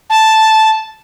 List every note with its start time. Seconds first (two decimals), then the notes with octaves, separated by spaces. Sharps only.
0.10 A5